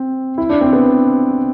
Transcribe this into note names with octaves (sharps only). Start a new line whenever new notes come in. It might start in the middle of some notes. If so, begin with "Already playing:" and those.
Already playing: C4
E4
D4
C4
B3